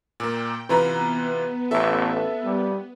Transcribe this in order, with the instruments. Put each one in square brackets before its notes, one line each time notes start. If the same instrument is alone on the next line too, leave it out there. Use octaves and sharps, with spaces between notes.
[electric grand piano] A#2 A#3 [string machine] G5
[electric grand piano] C3 E3 F4 [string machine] B3 [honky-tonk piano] B4 A#5 B5
[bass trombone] A1 [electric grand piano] A4 E5
[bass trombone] G3